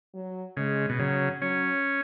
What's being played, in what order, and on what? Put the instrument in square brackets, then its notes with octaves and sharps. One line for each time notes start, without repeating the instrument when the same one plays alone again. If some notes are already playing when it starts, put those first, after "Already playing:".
[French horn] F#3
[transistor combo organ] C#3 [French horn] G#3
[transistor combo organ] B2
[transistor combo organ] C#3 [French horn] F#3
[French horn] F#3 [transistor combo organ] C#4